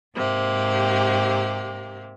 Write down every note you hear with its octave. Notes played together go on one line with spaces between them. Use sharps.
G#2 C3 A#3 G4